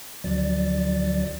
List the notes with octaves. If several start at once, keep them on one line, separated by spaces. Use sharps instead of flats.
D2 D3 F3 F#3 D5 A6